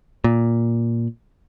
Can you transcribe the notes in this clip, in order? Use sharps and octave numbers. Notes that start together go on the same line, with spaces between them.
A#2